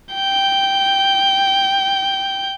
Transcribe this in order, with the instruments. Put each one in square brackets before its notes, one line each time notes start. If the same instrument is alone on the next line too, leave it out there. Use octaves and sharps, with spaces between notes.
[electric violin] G5 G6